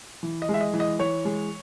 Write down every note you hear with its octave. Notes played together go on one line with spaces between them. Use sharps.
E3
D#5
G#3
E5
D#5
E3
D#5
E3 C#5
G#3